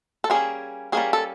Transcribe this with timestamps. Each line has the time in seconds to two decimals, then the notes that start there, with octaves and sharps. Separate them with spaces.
0.24 A4
0.30 G3 A#3 C#4 G#4
0.92 G3 A#3 C#4 G#4
1.13 A4